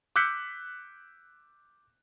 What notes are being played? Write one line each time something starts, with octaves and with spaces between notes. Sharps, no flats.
D6 E6 F#6 G6 B6 C#7